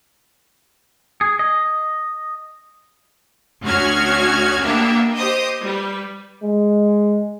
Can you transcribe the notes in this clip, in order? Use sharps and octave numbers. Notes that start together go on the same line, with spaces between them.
G#4
D#5
D2 C#4 F#4 F6 G#6
A#3 B3 D4 G4 E5
G4 C5 D#5 D#6
G3 B4
G#3